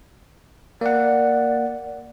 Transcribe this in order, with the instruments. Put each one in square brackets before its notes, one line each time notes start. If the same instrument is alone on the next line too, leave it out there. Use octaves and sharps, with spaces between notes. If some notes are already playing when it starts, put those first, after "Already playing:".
[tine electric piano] A#3 F#5 [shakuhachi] D5